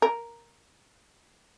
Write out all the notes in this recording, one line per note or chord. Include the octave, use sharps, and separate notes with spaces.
A#4